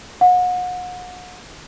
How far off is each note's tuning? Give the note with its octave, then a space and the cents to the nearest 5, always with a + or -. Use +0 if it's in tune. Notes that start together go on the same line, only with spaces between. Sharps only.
F#5 -35